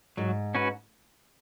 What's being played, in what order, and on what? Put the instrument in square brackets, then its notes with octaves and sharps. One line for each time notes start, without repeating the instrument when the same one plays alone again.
[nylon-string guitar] G#2 [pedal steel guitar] F#3
[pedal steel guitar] C#4 F#4 B4